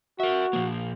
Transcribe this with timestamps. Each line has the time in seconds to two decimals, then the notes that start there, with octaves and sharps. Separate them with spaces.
0.20 F#4 A#4 E5
0.53 A#2 F3 A#3